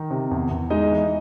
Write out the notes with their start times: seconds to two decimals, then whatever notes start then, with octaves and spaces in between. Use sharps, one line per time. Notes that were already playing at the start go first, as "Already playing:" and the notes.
Already playing: D#3
0.10 C3
0.31 E2
0.51 E2
0.70 G#3 D#4 D#5
0.91 E3